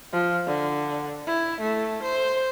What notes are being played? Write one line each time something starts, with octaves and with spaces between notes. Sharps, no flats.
F3
D3
E4
A3
C5